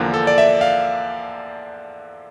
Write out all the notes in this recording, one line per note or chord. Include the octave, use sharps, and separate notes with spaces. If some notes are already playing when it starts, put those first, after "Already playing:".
Already playing: E2 D3 F3 A#3
A4
D5
E5
F5